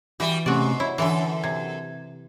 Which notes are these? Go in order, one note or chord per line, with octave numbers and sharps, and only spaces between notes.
E3 G3 F#4
G#2 C3 A3 C#4 F#4 D5
E4 C#5
F#2 D3 E3 A4
C3 G#6